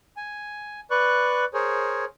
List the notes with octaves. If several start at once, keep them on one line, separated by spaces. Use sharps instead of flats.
G#5
B4 D5 C#6 F#6
G#4 A#4 C5 C#5